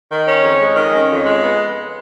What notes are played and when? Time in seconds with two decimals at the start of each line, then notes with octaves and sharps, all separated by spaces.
0.09 D#3
0.26 C#4
0.42 F2
0.59 G#3
0.76 D#3
0.93 C#4
1.09 F2
1.26 G#3
1.42 B3